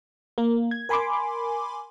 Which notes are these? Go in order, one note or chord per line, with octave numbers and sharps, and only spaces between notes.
A#3
G#6
A#4 G#5 B5 C6 D6